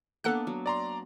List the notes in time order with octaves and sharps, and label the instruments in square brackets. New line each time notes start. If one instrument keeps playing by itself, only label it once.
[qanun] A#3 B3 D4 [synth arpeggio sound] A4 F#5 F#6
[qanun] F#3
[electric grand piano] D5 A#5 C6